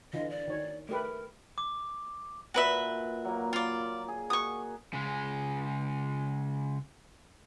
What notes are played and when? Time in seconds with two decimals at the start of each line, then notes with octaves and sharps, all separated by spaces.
0.13 D3 E3 F4 D#5
0.30 D5
0.48 D#3 C#5
0.89 A3 G4 A#4 B4
1.58 D6
2.54 A#2 F#4 B4 E5
3.25 F#3 A#3
3.53 F4 D5
4.08 G#4
4.30 F#4 C#6 D#6
4.93 C#3 G#3